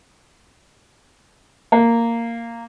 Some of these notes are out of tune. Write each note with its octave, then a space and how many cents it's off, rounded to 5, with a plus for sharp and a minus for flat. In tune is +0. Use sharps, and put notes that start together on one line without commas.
A#3 -10